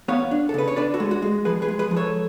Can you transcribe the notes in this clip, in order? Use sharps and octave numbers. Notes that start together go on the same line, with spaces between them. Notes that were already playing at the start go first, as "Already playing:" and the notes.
B3 C#5 F5
D4
A4
C#3 B4
C#5
D4 B4 D5
F#4 A4
G#3
F#4
G#3
F3 G#4 B4
G#4 B4
G#3
G#4 B4
F3
A4 C#5